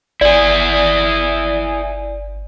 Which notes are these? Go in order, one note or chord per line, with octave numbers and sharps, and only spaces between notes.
G1 E4 G#4 D5